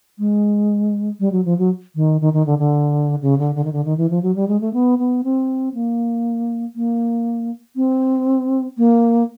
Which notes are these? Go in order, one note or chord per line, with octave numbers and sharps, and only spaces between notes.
G#3
G3
F#3
F3
F#3
D#3
D#3
D#3
D3
D3
C#3
D3
D3
D#3
D3
D#3
E3
F3
F#3
G3
G#3
A3
B3
B3
C4
A#3
A#3
C4
A#3